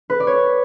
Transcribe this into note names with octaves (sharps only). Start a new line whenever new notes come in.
B4
D5
C#5